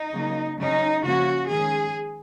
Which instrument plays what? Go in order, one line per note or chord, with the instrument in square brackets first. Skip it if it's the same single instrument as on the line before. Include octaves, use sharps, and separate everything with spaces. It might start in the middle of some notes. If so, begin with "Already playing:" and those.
Already playing: [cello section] D#4
C#3 F#3 A#3
C#3 F#3 C#4 D#4
C#3 F3 A#3 C#4 F#4
D#3 G#3 C#4 G#4